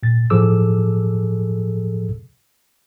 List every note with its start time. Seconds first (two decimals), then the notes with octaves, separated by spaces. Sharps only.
0.03 A#2 A6
0.30 A2 F3 G#4 A4 D6 E6